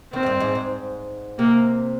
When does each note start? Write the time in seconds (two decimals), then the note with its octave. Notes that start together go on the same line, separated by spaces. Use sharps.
0.13 D#3 C4
0.23 G#2
0.26 G2
0.40 G#2
0.55 G#2
1.39 C3 A#3